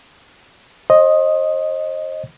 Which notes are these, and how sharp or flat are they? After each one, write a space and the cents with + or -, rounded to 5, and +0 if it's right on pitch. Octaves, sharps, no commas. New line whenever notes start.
C5 +40 D#5 +0